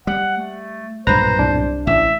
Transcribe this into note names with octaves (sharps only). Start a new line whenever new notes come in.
G3 F#5
A3
B1 G2 A#2 B4 C5 A#5 A#6
C2 D4
A1 E5